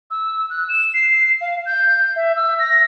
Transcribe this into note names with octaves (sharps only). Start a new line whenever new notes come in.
E6
F#6
E7
C7
F5
G6
E5
E6
A#6